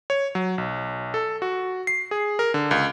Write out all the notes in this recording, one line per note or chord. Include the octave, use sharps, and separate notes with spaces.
C#5
F#3
B1
A4
F#4
C7
G#4
A#4
D3
C#2